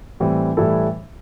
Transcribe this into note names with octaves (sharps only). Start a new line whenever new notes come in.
A2 E3 G3 C4 E4
A2 E3 G3 E4 A4